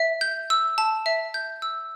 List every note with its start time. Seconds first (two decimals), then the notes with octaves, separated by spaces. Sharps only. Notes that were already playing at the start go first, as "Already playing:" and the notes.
Already playing: E5
0.21 G6
0.50 E6
0.78 A5
1.06 E5
1.34 G6
1.62 E6